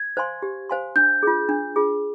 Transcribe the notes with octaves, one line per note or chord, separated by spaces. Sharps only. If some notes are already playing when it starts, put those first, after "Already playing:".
Already playing: G#6
C5 F5 G#5 C6
G4
C5 F5 G#5 C6
D4 G6
F4 G#4
D4
F4 G#4